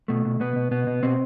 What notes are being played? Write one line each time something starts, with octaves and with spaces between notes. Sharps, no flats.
B2 A3
B2
B2 B3
B2
B2 B3
B2
B2 C4